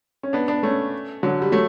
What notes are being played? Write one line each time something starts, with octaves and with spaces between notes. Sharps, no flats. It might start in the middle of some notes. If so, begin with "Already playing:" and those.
C#4
B3 D4
B3 D4
A3 C#4
D3 F#3
G3
F#3 A3